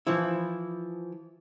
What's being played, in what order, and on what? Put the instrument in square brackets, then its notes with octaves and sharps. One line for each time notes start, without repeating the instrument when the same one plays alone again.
[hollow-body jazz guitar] E3 F3 E4